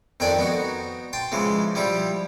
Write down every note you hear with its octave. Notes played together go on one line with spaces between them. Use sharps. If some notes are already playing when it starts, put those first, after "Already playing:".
F2 D#3 D4 D5 G5 G#5
B3 D#4 F#4
G5 A5 C6
C#3 E3 F3 G#3
F3 G3 E4 G4